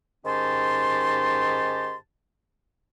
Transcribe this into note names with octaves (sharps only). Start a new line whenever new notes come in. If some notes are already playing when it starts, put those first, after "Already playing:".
G#2 D#3 C#4 G4 A5 C6